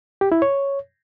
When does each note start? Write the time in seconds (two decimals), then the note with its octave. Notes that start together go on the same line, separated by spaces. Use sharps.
0.21 G4
0.32 E4
0.42 C#5